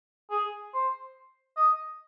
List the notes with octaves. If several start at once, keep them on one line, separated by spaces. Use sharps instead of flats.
G#4
C5
D#5